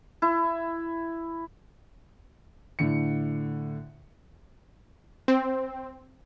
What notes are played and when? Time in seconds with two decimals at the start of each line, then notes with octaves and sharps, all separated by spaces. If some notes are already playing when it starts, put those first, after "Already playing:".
0.22 E4
2.79 A2 D3 C#7
5.28 C4